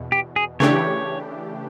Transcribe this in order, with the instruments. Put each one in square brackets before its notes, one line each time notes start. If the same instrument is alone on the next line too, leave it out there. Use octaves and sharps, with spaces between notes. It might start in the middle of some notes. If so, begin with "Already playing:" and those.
Already playing: [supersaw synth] E2 B2
[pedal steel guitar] G4
G#4
[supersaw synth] C#3 E3 A3 D4 G4 [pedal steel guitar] C#5